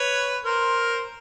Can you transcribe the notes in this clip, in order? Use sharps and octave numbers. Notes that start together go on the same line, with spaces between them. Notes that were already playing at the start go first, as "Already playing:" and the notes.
Already playing: B4 C#5
A#4 C5